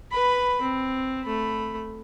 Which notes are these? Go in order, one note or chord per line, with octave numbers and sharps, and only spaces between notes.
B4 B5
C4
A3 B5